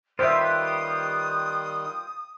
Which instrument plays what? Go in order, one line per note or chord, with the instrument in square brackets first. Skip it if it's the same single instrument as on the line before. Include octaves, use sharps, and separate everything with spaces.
[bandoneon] D#3 G3 [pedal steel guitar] F4 G4 B4 [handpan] C5 E5 [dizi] D#6